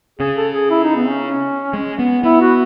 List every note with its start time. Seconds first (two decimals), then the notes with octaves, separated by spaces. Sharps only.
0.19 C#3 G#4
0.36 A4
0.54 G#4
0.70 E4
0.83 D#4
0.96 B3
1.08 C#4
1.73 G#3
1.99 B3
2.23 B3 E4
2.41 F#4